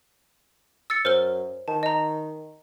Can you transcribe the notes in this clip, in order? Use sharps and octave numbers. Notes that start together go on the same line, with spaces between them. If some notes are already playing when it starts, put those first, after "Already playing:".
E6 A6 C#7
F#2 C5 F6 G7
D#3 A5
D#5 A#5